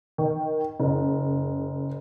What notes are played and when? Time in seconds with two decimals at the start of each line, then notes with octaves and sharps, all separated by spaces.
0.18 D#3
0.80 F#1